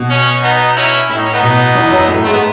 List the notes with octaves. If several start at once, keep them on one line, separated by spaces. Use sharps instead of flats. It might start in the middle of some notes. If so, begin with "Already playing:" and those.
Already playing: B2
C#4
B3 D#4
D#4
C#4 E4
A2 E4
D#4
C#4
B3 D#4
B2
E2 E3
F#2 F#3
A2 A3
G#2 G#3 A3
B3